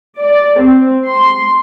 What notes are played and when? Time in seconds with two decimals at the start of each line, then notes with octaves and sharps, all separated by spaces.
0.18 D5
0.58 C4
1.06 C6